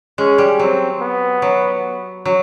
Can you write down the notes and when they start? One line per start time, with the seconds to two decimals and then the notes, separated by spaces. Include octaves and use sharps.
0.18 G#3 C#4
0.38 G3
0.59 F#3 C4
1.01 B3
1.42 F#3
2.25 F#3